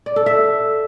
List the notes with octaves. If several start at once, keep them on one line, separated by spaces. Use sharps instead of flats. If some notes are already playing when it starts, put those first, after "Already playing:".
D5
A4
E5